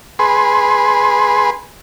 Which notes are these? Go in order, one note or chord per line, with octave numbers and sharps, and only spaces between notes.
G#4 B4 C6